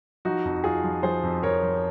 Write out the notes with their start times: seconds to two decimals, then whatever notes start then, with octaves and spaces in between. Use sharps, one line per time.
0.25 F3 D#4 F#4
0.45 F2
0.64 F2 F4 G#4
0.84 F3
1.03 F3 G#4 C5
1.23 F2
1.43 F2 A#4 C#5
1.63 F3